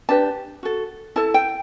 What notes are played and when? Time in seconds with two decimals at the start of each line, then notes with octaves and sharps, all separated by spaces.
0.09 D4 G4 B4 A5
0.63 F#4 A4
1.16 E4 A4 A5
1.34 G5